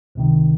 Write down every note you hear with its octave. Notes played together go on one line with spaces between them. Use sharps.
C#2 C3 D#3